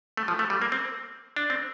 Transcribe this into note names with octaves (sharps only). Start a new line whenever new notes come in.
A3
F3
A3
G3
A#3
C4
D4
C4